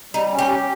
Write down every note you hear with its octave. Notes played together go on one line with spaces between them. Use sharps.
G3 D#4
C#4
G4
G4